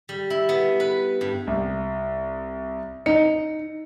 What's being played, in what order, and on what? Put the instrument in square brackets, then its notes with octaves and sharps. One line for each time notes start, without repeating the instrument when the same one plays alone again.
[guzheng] G3
E4
B3
B4
G2
[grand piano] C2
[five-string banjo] D#4 [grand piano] C#7